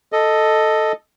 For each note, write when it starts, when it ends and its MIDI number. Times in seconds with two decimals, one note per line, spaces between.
0.12 0.92 69
0.12 0.92 75